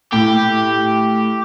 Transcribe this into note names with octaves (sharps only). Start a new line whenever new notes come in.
A2 G4